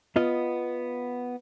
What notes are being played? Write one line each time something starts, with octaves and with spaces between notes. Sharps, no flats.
B3 F4 D#5